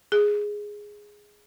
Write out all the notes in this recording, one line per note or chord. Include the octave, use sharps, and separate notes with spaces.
G#4